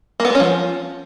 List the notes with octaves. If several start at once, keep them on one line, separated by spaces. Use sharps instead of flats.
A#3
B3
G#3
C#4
F3